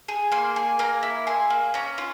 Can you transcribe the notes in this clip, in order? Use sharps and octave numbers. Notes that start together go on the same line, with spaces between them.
G#4
A#3 C6
G#4
A#3 A#5
E4
G#4 C6
A#3
C#4 A#5
F4